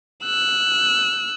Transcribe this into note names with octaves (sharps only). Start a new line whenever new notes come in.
E6 F#6